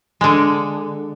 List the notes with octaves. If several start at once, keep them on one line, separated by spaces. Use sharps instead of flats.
D3 G#3